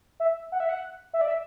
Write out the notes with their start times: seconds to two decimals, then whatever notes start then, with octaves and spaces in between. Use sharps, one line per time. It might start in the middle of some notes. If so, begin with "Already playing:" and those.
0.20 E5
0.52 F#5
0.60 E5
0.69 F#5
1.13 E5
1.21 D5
1.28 E5